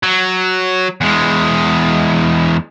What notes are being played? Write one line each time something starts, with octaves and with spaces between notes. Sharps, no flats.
F#3
E2 G#3